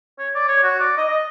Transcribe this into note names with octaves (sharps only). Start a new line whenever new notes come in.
C#5
D5
C#5
F#4
D5
D#5
D#5